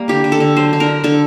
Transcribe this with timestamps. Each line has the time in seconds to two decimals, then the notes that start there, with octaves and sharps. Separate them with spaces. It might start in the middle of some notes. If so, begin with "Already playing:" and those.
Already playing: G3 A#3
0.08 D3 G4
0.24 D3
0.32 A4
0.40 D3
0.57 F#3 C5
0.73 D3
0.80 A#4
0.88 D3
1.04 D3 A4